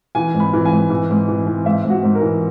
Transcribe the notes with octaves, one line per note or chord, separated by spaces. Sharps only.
E3 G#5
G#2
B5
E3
G#5
G#2
E3
G#2
E3
E3
G#2 E5
G#2
F#4
G#2
A#4
E3